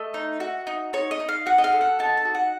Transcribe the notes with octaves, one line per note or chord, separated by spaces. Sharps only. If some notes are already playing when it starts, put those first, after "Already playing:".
Already playing: A3 D#5
D#4
F#4
D#4
D#4 C#5
D#5
D#4
F5
F#4 F#5
D#5
F5
A4
F#5
D#4 A5
A5
F#4
F#5